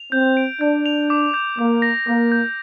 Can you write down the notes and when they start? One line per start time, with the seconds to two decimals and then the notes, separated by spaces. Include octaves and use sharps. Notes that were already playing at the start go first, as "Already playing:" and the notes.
Already playing: F7
0.12 C4 G6
0.37 D7
0.61 D4 G6
0.86 F7
1.10 D6
1.34 G6
1.58 A#3 D6
1.82 A#6
2.07 A#3 D6
2.32 G6